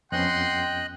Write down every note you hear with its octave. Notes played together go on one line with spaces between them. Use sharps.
F2 B3 C#4 D#5 F#5 G5 C6 F#6